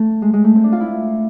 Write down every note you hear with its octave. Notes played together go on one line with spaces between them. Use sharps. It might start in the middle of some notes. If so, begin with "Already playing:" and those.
Already playing: A3
G#3
G#3
A3
C4
D4
F4
E4